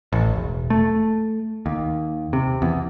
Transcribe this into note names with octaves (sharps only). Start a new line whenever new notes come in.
A1
E1
A3
D#2
C3
E2